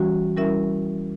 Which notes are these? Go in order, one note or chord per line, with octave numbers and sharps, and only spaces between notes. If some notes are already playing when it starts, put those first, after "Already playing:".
Already playing: E3 G3 C#4 F#4
G3 C#4 E4 A#4 E5